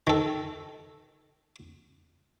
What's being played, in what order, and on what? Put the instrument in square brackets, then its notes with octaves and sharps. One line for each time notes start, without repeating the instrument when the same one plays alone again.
[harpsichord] D#3 A4